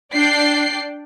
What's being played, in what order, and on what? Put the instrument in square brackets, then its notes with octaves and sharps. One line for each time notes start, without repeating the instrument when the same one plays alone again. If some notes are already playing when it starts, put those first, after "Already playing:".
[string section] D4 D5 G5 C7